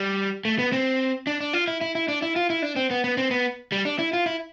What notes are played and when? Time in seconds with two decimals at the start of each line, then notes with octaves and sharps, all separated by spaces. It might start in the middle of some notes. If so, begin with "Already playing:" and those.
Already playing: G3
0.45 A3
0.59 B3
0.72 C4
1.27 D4
1.40 D4
1.53 F4
1.68 E4
1.81 E4
1.95 E4
2.08 D4
2.22 E4
2.36 F4
2.50 E4
2.62 D4
2.76 C4
2.91 B3
3.04 B3
3.17 C4
3.31 B3
3.72 G3
3.85 D4
3.99 E4
4.13 F4
4.26 E4